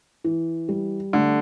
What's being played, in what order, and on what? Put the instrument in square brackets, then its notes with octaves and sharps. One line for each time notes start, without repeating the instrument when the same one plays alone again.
[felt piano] E3
G3
[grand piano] D3 [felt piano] A3